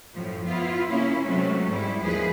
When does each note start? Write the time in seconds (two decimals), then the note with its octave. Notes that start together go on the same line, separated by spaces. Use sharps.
0.14 F#2 A2 F3
0.48 B3 E4 F4
0.87 C#3 A#3 C#4 E4
1.24 C3 F#3 G#3 A3 C#4
1.70 G#2 G3 G#3 E4
2.02 D#2 F3 G#4 B4